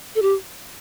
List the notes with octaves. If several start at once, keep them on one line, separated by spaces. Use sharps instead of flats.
A4
G4